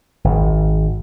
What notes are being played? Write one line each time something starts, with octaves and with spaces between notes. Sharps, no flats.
G#1